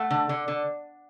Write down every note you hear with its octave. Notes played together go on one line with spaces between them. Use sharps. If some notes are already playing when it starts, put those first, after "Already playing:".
Already playing: A3 F#5
D3
D3
D3